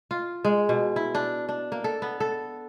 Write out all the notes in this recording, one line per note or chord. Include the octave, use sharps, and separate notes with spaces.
F4
G#3
B2
E4
D4
D4
A#3
A4
B3
A4